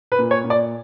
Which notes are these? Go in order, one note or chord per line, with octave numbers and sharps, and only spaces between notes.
B4
A#2
C#5
A#2
D5